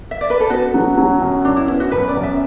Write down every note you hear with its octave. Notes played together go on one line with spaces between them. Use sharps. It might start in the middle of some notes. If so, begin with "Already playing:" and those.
E5
D5
B4
A4
B3 F#4
F#3
F#3
F#2
F#2 D4
E4
B3 E4
F#4
F#2 B4
D5
F#2
E5